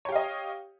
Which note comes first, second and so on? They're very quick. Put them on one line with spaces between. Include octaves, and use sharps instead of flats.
C#5 G4 F5 D#5